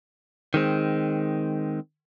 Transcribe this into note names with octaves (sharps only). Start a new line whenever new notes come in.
D#3 G#3 C4